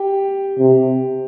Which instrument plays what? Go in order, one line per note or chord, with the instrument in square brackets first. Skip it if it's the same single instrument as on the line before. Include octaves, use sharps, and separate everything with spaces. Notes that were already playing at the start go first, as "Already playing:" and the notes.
Already playing: [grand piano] G4 G5
[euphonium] C3